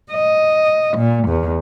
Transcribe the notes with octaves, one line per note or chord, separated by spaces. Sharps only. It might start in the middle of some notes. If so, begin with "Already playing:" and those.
D#5
A#2
E2